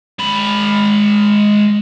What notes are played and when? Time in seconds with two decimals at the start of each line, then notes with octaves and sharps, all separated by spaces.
0.19 G#3 B5